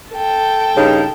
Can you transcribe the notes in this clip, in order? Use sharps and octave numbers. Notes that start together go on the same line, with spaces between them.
A4 G5
G2 C#3 D#4